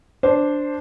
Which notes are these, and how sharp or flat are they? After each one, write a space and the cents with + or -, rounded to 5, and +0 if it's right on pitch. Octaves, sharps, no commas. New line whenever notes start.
D4 +0 C5 +0